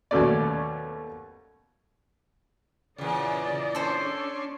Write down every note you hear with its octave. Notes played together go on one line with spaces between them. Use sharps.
D#2 B2 F#3 A3 C#4 D5
E2 A#2 C#3 D5 D#5
C#4 D4 A4 C5 C6